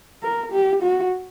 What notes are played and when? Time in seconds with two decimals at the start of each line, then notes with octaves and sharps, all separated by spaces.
0.23 A#4
0.52 G4
0.82 F#4